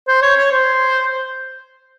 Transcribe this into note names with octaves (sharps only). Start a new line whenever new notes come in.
C5
C#5
C#5
C5